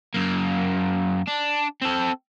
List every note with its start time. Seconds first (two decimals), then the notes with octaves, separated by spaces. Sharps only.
0.14 F#2 A#3
1.27 D4
1.82 C4 A4